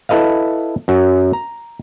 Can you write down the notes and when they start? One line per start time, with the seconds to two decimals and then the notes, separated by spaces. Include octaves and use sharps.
0.09 E4 A4 B4 D#5 F5
0.88 F#2 F#3
1.33 A#5